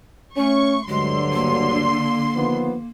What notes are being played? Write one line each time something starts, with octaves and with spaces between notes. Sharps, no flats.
A3 C#4 C#6
D2 G2 D3 F#3 G#3 C6
A#3
D#3 F3 B3